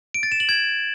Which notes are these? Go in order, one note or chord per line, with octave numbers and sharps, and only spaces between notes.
D7
A6
E7
F#7
G#6